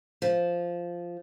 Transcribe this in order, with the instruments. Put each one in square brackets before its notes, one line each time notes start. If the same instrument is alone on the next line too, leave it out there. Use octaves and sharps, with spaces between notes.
[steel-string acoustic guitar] F3